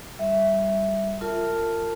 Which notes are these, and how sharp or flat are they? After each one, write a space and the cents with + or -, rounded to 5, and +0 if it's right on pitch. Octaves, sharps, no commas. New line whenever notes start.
G3 +0 E5 +0
F4 +0 A#4 -35 A5 +0